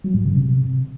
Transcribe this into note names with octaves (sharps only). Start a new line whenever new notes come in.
F#3
G#2
C#3
C3